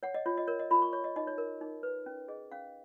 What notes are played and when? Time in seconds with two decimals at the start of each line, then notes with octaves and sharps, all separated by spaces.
0.03 C#5 F#5
0.14 D#5
0.26 F4 C#5
0.37 D#5
0.48 A#4 C#5
0.59 D#5
0.71 F4 B5
0.82 C#6
0.93 C#5 C#6
1.04 D#5
1.16 D#4 D#5
1.27 C#5
1.38 A#4
1.61 D#4
1.83 B4
2.06 C#4
2.28 G#4 D#5
2.52 C#4 F5